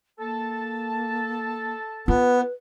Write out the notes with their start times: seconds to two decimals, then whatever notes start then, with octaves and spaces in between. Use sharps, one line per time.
0.19 A#3 A4 A5
2.08 B3 F4 B4